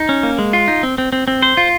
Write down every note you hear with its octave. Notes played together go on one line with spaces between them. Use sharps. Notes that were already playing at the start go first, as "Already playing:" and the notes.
Already playing: D#4
C#4
A#3
G#3
F4
D#4
C4
C4
C4
C4
C5
F4